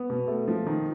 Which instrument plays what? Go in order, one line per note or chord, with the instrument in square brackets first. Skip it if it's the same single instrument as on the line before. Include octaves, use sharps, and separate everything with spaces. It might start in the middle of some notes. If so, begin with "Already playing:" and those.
Already playing: [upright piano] B3
B2
A3
F3
D#3